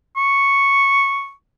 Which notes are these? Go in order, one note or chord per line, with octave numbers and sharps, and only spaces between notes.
C#6